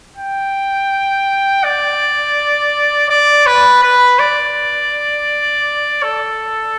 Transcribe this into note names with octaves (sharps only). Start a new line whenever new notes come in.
G5
D5
D5
B4
B4
D5
A4